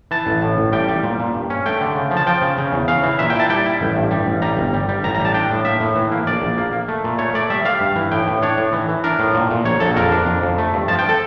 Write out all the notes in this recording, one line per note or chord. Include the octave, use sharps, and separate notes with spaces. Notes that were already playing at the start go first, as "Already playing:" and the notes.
E3 A5
A1
A2
A1
G3 G5
G3
A#2
A#2
G2
C#4
A3 G5
D3
C#3
F3
A5
F3 G5
C#3
C#3
E2
C#3 F5
E3
A#2 E5
G5
E4 A5
G3 G5
E4
A1
G2
G3
A1
G3 A#5
G1
G3
G3
A1 A#5
A#5
G3
A5
D4 G5
A2
A#3 E5
A2
E3
A#3
A#1 D5
A#1
A#3
A#3
A3
A#2
A3 C#5
A3 D5
G3 E5
G3 F5
G2
E3
A2 G5
A2
D4 C#5
A2
E3
E3
D4 A#4
A2
A#2
A#2
A#1 C#5
A#1 A4
F2 A#4
D4
F2
F2
A3
G2
F3 A5
G5
A4